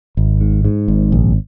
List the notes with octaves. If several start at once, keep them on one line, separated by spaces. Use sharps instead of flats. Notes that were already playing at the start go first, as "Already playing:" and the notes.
G#1
G#2
G#2
G#1
A#1